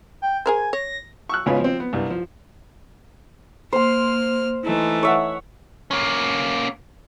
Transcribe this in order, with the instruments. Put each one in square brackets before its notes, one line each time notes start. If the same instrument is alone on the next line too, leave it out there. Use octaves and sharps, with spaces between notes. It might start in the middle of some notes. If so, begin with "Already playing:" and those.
[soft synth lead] G5
[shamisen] G#4 A#4 C5 [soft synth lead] G#5
[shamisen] C#5 [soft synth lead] A#6
[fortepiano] C#6 E6 F#6
G#1 C#3 B3 F4 B4 C#5
F3 C4
B3
C2 G2
F3
[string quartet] A#3 F6 [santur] C5 C6
[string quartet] E3 A3 D#4
[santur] C#5 E5 F#5
[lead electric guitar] A#3 C#4